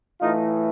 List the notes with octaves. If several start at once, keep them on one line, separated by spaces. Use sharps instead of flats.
A2 E3 A3 D#4 F4